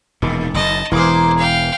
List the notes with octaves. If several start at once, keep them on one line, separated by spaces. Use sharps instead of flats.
E1 A#2 D#3
F#1 F#2 D#5 A5
E1 E3 A#3 G#4 C5 D6
F5 G5